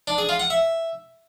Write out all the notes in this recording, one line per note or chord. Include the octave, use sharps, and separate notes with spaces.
D4
G#4
F4
F#5
E5